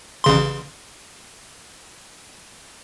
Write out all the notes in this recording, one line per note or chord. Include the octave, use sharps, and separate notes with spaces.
A1 C#3 C6